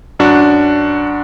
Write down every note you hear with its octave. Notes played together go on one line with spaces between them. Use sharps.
F#2 D4 F#4